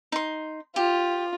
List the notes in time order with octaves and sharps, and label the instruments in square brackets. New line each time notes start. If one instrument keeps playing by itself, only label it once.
[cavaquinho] D#4 C6
[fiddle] F4 [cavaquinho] G4